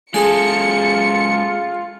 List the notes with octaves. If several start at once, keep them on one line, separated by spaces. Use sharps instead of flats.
G#3 C#4 F4 G#4 A4 G#5 C#7